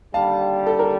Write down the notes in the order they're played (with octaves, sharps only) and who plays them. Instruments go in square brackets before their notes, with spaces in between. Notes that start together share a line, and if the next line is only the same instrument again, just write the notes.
[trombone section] D#2 D3 G3 [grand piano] F5 A5
[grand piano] A4
A#4